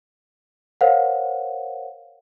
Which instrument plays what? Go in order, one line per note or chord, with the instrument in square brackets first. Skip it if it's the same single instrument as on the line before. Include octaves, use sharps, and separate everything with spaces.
[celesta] A#4 C5 C#5 F5 F#5